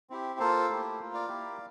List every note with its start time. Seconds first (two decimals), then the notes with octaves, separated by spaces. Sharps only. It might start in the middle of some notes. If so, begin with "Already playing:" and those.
0.10 C4 E4 G4
0.39 A#3 F4 A4 C5
0.70 A3 E4 G4
0.99 A#3 F4
1.14 D5 F5
1.28 A#3 E4 G4